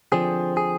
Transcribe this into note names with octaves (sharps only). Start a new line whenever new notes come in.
D3 F3 C4 G#4
G#4